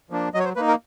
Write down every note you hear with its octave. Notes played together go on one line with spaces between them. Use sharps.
F3 A#3 D4
F#3 D#5
C#5
C5
A#3 D#4 B4
A#4